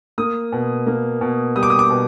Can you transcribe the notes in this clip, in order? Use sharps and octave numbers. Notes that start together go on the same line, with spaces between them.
A#3 D#6
B2
A#3
B2
G3 D#6
D6
D#6
D6
B2